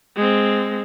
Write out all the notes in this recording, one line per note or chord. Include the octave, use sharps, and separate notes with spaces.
G#3 C4